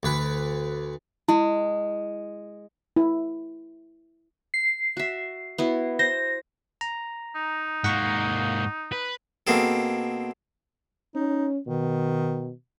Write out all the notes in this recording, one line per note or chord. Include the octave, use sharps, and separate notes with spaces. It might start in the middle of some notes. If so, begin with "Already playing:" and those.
D2 B4
G#3 E4
E4
C7
F#4 E5
B3 E4 F#4
C5 A#6
A#5
D#4
G#2 A#3 F#5 C#6
B4
B2 A#3 C4 G#4 A4
C#4 D#4
B2 D#3